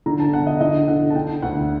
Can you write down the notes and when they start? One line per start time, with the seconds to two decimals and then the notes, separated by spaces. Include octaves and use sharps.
0.06 D3 A#5
0.20 A5
0.33 G1 F#5
0.47 D#5
0.60 D3 D#5
0.88 D3 F#5
1.10 A5
1.15 D3 G5
1.42 D2 F#5